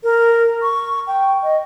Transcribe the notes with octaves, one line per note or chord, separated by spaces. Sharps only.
A#4
C#6
G5
D#5